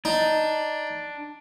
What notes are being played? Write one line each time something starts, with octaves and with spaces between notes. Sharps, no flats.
D4 D#4